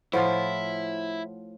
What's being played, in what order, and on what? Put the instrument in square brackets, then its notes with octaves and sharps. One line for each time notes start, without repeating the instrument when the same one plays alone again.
[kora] A2 F3 F4 [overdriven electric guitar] E4 [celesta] C5 F#5